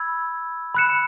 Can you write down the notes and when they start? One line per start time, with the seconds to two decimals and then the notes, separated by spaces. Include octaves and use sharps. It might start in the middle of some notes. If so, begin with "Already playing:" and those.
Already playing: B5 E6 G#6
0.74 B5 F#6 C#7 E7